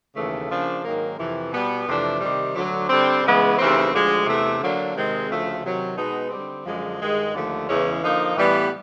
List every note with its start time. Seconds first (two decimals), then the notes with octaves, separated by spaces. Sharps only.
0.15 D#2 C#3 E3 A3
0.49 C#3 F3 A#3 D4
0.84 G#2 D#3 F#3 A#3
1.17 F2 C3 E3
1.52 B2 G3 B3
1.86 F2 C3 E3 A3 D4
2.20 C3 D#3 G3
2.54 D2 D3 F#3
2.88 D3 G3 C4
3.23 C#3 E3 G#3 B3
3.57 D#2 C#3 E3 A3 C4
3.91 D2 D3 F3 G#3
4.25 E2 C3 E3 A3
4.59 D3 F#3 A#3 D4
4.93 C3 D#3 G#3 C4
5.27 D2 C#3 F3 A3
5.61 C3 D#3 F#3
5.95 B2 G#3 B3 D#4
6.29 D3 G3 C4
6.64 F#2 D3 F3 G#3
6.98 G2 D#3 G#3
7.33 D#2 D3 F3 A3
7.67 E2 C#3 E3 G#3 C#4
8.01 D3 F3 A#3 D#4
8.34 A2 E3 G3 B3